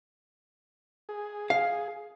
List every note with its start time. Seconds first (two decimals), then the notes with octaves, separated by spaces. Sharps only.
1.09 G#4
1.50 F5